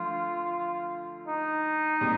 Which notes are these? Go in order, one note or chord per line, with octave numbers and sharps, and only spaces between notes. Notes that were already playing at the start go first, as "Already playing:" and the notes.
Already playing: D3 F3 A3 F4
D#4
A#2 G3 C4